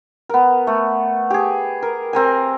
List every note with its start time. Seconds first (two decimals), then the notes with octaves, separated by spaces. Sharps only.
0.29 B3 A#4
0.67 A3
1.30 G4 G#4
1.83 A#4
2.13 C4 A#4 G#5